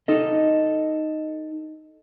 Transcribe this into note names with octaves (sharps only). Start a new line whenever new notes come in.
D#4 A4 D#5